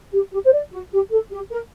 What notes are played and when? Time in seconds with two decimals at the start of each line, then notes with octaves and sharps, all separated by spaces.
0.12 G4
0.32 G4
0.44 C5
0.52 D5
0.72 F#4
0.92 G4
1.11 A4
1.31 G4
1.51 A#4